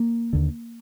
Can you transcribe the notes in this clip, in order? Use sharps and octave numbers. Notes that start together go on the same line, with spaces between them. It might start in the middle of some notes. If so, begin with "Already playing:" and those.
Already playing: A#3
D#2 D3